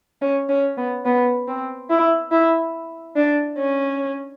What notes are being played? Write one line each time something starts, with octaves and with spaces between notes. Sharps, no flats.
C#4
C#4
B3
B3
C4
E4
E4
D4
C#4